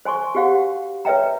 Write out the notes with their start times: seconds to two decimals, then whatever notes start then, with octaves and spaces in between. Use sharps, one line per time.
0.05 C5 G#5 C6 C#6
0.35 F#4 G4 C5 F5 F#5
1.05 B4 C#5 E5 G5 A#5